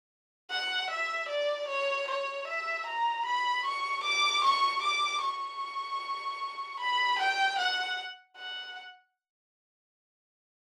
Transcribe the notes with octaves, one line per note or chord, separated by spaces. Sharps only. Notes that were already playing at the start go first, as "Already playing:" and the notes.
F#5
E5
D5
C#5
C#5
E5
A#5
B5
C#6
D6
C#6
D6
C#6
B5
G5
F#5
F#5